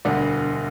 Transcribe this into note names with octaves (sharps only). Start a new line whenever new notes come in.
E1 D2 D3 G3 D5 F#5